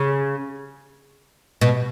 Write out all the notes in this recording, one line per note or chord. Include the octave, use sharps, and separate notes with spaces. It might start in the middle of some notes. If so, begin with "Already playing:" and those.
Already playing: C#3
B2